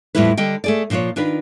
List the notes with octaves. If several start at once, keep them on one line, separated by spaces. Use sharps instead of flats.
E2 A2 F3 G3 E4 B4
D3 G3 D#5 G5
A3 G#4 D5
A#2 F3 D4 F4 C#5
D#3 D4 F4 B4